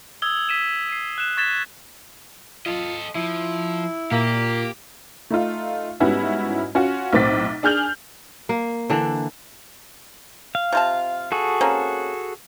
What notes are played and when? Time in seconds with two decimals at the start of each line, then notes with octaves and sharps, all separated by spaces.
0.22 D#6 E6 G#6 G7
0.48 E6 B6 D#7 E7 G7
0.89 C7 D#7
1.18 F#6 E7
1.37 C#6 G#6 A6 B6 E7 G7
2.66 F4 A4 D#5
3.16 F3 E4
4.12 A#2 A#3 G4
5.31 A3 D#4 F4
6.00 G#2 G3 B3 C#4 E4 F#4
6.75 C#4 F4 F#4
7.13 B1 A2 C4 D6 A6 B6
7.63 D4 G#4 F6 G6 F7 F#7
8.49 A#3
8.90 D3 E3 D4
10.55 F5
10.72 C3 F4 A5
11.32 F#4 G#4 A4
11.61 A#3 C4 C#4